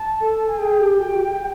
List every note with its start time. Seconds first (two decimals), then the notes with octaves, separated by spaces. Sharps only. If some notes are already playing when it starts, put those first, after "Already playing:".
Already playing: A5
0.21 A4
0.48 G#5
0.59 G#4 G5
0.79 G4
0.98 F#4